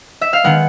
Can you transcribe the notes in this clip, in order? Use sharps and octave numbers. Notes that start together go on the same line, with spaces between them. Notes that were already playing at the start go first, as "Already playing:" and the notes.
E5
F5
D#3 G#3 B3 F#5